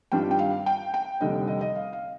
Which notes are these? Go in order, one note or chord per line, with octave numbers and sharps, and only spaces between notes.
G2 D#3 G3 D4 F4 G5
G5
F5
G5
G5
F1 D#2 D3 G3 D#5
D#5
D#5
F5
F5